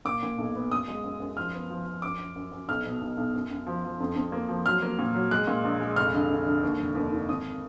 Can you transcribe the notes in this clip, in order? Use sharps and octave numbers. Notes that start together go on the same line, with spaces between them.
A#2 D6
A#2
B1
B3
F#2 D#6
G#3
F#2
F#2
F3 F6
B3
F3
F3
F#2 D6
F#2
F#2
F#2
B1 F6
B2
B1
B1
F#2
F#2
F3
F3
F2
F2
A#3
F3
F#3 F6
A#3
A#2
F#3
G#3 F#6
A#2
A#1
G#3
F1 F6
D3
D3
D3
D#2
F1
D#2
D#3
G#1 D#6